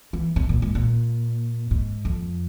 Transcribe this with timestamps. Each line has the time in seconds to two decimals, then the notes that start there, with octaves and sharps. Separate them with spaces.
0.13 E3
0.36 C3
0.49 A#2
0.62 G#2
0.75 A#2
1.71 G#2
2.05 F2